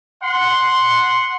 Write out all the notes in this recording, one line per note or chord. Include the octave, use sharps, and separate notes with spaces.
F#5 C6